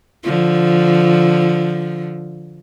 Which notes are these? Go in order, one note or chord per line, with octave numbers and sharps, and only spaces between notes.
D3 F3